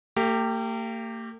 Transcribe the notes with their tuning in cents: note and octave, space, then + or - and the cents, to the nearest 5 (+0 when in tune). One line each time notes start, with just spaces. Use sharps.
A#3 -45 G4 +0